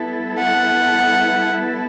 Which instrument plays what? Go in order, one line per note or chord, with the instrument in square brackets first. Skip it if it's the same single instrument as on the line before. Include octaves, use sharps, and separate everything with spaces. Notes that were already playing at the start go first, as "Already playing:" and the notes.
Already playing: [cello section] G3 B3 E4 A4
[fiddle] F#5